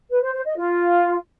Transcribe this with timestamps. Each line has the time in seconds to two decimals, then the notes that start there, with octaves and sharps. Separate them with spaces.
0.10 B4
0.22 C5
0.33 C5
0.45 D#5
0.57 F4